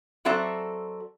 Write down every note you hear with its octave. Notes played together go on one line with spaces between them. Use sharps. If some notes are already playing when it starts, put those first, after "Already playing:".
F#3 C4 F#4 A4 D5 E5